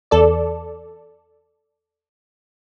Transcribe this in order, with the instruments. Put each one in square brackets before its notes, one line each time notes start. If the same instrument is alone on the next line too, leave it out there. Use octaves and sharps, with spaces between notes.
[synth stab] E2 A4 D5